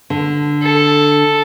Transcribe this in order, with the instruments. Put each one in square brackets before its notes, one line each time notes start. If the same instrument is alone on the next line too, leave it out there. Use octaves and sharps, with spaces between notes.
[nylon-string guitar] D3
[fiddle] A4